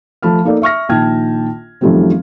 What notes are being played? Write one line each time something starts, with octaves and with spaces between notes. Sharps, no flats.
F3 A3 A5 B5 F6
A#3 D#4 A4 D5
E5 C#6 F6 A#6
A#1 D#3 G5 A5 F6 G#6
F#2 D#3 F3 G3 A3 C4